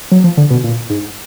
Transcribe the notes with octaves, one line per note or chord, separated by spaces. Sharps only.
F#3
F3
D3
B2
A#2
G#2